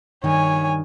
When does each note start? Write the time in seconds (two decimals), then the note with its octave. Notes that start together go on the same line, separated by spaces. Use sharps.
0.24 G2 D#3 C#5 G#5